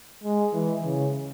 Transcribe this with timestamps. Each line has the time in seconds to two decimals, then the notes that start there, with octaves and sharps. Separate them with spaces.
0.24 G#3
0.53 E3
0.84 C#3